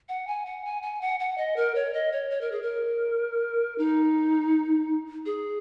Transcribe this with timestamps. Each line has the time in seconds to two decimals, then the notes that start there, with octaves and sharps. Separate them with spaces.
0.09 F#5
0.27 G#5
0.46 F#5
0.65 G#5
0.82 G#5
1.01 F#5
1.20 F#5
1.38 D#5
1.56 A#4
1.75 C#5
1.94 D#5
2.12 C#5
2.30 C#5
2.41 A#4
2.52 G#4
2.62 A#4
3.78 D#4
5.26 G#4